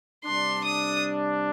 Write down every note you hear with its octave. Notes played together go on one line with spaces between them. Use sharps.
C3 G3 D4 C6
D#6